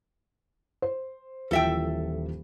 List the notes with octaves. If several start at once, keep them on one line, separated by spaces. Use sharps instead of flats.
C5
D#1 E3 F3 A4 E5 G5